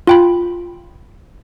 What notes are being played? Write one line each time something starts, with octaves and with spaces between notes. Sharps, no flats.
F4 G5 B5